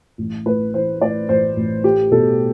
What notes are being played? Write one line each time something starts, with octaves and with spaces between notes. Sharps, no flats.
A1
A2 B4
E3 C5
A2 D5
A1 C5
A1
A3 G4
B2 A4